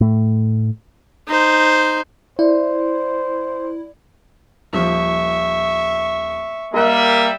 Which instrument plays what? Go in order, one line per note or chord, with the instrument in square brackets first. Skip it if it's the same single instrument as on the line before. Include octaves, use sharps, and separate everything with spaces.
[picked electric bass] A2 A3
[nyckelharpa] D#4 C5
[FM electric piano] E4 [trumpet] C5 [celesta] D5
[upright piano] D#1 F3 [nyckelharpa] E5 C#6
[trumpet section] G3 E5 [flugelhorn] A#3 [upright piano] A#4 D#5 F#6